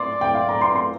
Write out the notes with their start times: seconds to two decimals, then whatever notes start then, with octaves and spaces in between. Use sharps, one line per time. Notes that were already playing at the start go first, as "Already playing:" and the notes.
Already playing: D5 C6
0.21 G5
0.35 F5
0.49 A#5
0.61 C6
0.75 C6